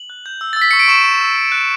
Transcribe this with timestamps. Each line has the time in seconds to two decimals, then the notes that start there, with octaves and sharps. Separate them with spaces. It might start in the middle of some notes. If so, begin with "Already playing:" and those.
Already playing: F#7
0.10 F#6
0.26 G6
0.41 E6
0.53 E6 A6
0.62 B6
0.71 C#6 C#7
0.79 D7
0.88 C#6 E7
1.04 C#6
1.21 E6
1.36 E6
1.52 F#6